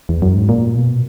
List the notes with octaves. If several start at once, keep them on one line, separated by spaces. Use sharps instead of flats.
E2
F#2
G#2
A#2
B2